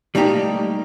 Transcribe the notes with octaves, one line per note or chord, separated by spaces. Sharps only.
G3 A3 A#3 D#4 G4